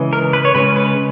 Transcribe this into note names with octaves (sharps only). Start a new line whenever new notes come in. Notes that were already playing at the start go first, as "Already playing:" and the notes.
Already playing: C#3 E3 G#3
A#4
B4
C#5
C#3 G#3 C#4 B4
B4